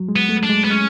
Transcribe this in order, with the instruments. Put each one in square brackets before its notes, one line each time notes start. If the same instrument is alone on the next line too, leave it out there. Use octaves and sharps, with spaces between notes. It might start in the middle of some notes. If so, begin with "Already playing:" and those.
Already playing: [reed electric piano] F#3
G#3
[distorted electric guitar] B3
[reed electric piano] A3
[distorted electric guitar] D4
[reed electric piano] G#3
[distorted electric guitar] B3
[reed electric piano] G#3 [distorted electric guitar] C#4